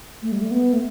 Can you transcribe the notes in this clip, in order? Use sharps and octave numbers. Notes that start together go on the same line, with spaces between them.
A3
G3
A3
B3
A3